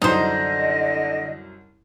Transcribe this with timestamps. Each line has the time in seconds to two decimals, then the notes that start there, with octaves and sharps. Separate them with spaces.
0.02 C2 F#2 D3 D#4 C5 D#5